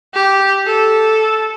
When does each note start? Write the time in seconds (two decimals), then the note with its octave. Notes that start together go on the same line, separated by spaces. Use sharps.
0.14 G4
0.67 A4